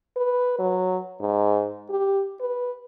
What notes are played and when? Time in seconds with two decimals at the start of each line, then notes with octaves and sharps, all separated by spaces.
0.17 B4
0.59 F#3
1.20 G#2
1.90 G4
2.41 B4